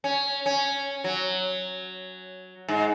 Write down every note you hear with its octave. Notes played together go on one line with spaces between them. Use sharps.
C#4
C#4
F#3
G#2